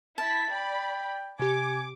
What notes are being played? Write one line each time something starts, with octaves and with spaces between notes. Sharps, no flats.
E4 A5 B6
D5 G5 B5
C3 G4 G#5 D6 C#7